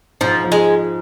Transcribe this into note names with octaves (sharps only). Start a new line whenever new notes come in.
G#2 F3
F3
G#3